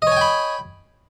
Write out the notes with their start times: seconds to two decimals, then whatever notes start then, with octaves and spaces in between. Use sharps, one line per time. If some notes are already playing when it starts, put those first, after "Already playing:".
0.02 D#5
0.07 C#5
0.12 G#5
0.16 G5
0.21 B5